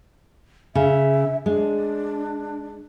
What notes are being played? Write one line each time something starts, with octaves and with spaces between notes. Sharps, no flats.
C#3 E5
G#3 D4